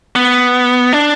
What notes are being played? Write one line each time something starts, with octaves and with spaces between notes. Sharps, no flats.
B3
D4